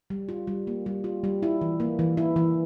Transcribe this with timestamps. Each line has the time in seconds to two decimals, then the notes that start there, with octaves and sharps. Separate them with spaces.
0.10 G3
0.29 F4
0.47 G3
0.67 A#3
0.86 G3
1.04 F4
1.24 G3
1.43 E4
1.61 E3
1.80 A#3
1.99 E3
2.17 E4
2.36 E3